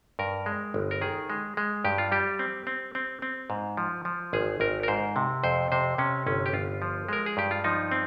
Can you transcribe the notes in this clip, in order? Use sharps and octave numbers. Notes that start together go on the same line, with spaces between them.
G2 A#4
G#3
G1
A#4
D#3 G#4
G#3
G#3
G2 G4
F4
G3 G4
C4
C4
C4
C4
G#2
F3
F3
G#1 G#4
G#1 A#4
A#4
G#2 C5
C3
F2 C5
C3 C5
C3 C#4
G1 C#4
G4
G1 F4
F3
G#3 A#4
G#4
G2 G4
F4
F3 D#4
C4